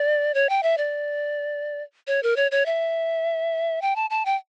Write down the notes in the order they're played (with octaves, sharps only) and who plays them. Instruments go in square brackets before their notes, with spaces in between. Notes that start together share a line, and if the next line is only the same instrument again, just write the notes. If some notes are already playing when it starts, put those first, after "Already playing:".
Already playing: [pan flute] D5
C#5
G5
E5
D5
C#5
A#4
C#5
C#5
E5
G5
A5
A5
G5